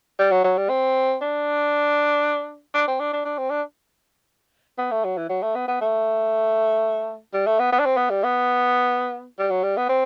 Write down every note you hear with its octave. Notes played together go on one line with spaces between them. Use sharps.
G3
F#3
F#3
G3
C4
D4
D4
C4
D4
D4
D4
C4
D4
B3
A3
F#3
E3
F#3
A3
B3
B3
A3
G3
A3
B3
B3
D4
C4
B3
G3
B3
G3
F#3
G3
B3
C4